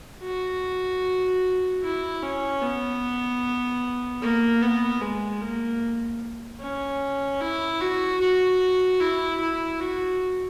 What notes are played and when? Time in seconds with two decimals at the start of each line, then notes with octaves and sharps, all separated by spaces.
0.23 F#4
1.83 E4
2.22 C#4
2.62 B3
4.22 A#3
4.62 B3
5.01 G#3
5.41 A#3
6.61 C#4
7.40 E4
7.80 F#4
8.21 F#4
9.00 E4
9.40 E4
9.80 F#4